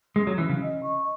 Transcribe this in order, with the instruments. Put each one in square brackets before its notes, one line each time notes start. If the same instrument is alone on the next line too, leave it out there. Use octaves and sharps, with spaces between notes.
[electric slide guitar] G#3 [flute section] C#4
[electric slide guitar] F#3
[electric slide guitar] E3 [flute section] C#4
[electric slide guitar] C#3
[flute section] D#5
C#6